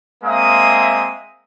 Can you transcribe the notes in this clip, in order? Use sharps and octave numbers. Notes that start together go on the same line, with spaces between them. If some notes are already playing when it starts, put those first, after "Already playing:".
G#3 A#3 C4 E5 D#6